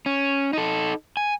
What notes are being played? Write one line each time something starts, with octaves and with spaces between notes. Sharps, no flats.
C#4
D#4 A4
G#5